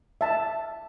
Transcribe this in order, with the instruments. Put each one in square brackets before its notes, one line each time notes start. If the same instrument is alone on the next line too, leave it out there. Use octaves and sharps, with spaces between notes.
[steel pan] E5 A5